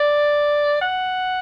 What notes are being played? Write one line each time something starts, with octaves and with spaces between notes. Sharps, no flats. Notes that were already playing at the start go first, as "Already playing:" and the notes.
Already playing: D5
F#5